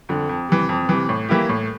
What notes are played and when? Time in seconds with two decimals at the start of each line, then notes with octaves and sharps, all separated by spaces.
0.09 F2 D3
0.29 F2
0.49 C3 E3
0.69 F2
0.89 C3 E3
1.09 A2
1.29 E3 A#3 E4 G4
1.49 A2